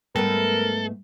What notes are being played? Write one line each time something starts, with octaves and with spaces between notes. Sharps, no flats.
G#2 G3 A3 B3 A4 A#4